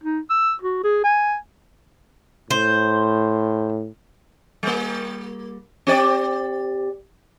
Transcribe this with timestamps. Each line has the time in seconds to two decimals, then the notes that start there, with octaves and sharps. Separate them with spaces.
0.04 D#4
0.30 E6
0.62 F#4
0.84 G#4
1.04 G#5
2.51 A2 C5
4.63 G3 A#3
5.87 C4 G4 D5